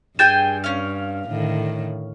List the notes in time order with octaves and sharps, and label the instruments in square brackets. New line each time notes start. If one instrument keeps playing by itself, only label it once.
[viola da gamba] G2 [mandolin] G#4 G5 G#5 [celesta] G6 A6 E7
[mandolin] C#4 F5
[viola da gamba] A2 D3 D#3